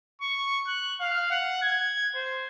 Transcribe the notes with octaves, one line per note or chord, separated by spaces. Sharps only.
C#6
F#6
F5
F#5
G#6
C5